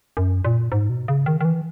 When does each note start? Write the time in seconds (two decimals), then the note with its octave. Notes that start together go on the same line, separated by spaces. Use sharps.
0.17 F#2
0.45 A#2
0.72 G#2
0.90 B2
1.08 C#3
1.26 D#3
1.41 D#3
1.45 E3